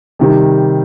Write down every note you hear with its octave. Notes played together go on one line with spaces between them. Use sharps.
C3 D#3 G3